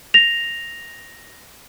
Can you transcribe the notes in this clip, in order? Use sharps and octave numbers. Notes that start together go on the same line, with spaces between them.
A#6 F7